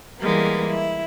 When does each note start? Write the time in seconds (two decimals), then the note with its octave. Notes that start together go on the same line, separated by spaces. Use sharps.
0.19 E3 G3 G#3 A#3 B3
0.69 E4